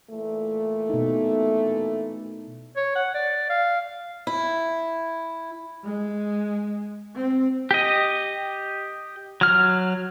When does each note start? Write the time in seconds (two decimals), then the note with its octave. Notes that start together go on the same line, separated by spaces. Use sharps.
0.11 A#2 E3 A3
0.89 B2 D#4
2.76 C#5
2.95 F#5
3.14 D5
3.50 F5
4.27 E4
5.83 G#3
7.16 C4
7.71 G4 D#5
9.41 F#3 F6